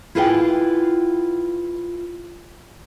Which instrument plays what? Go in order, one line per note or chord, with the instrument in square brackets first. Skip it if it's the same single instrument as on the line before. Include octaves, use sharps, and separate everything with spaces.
[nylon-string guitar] E4 F4 G#4 B4 F#5 G5